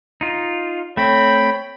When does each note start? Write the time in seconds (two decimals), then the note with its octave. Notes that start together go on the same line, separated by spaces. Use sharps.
0.21 D#4 F4
0.97 A3 C4 C#5 G5 B5